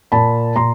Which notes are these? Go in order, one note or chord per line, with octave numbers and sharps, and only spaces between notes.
A#2 A5 B5
A#2 A#5 C6